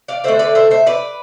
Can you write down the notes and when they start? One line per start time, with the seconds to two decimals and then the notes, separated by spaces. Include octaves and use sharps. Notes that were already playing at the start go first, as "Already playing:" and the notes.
0.08 D5 F5
0.24 D3 A3 C5 E5
0.39 B4 D5
0.55 C5 E5
0.71 C5 E5
0.86 B4 D5